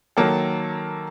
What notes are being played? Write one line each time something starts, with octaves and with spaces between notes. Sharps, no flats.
D#3 F#3 A#3 A4